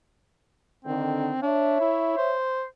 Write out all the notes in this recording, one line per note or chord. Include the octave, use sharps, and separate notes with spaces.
D3 D#3 C4
D4 C#5 E5
E4
C5